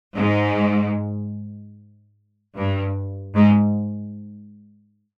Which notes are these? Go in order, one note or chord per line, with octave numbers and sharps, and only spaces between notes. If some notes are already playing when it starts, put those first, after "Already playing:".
G#2
G2
G#2